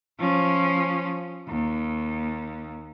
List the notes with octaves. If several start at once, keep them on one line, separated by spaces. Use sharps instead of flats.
F3 C#4
D#2